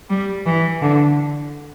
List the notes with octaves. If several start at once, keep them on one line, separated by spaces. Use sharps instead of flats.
G3
E3
D3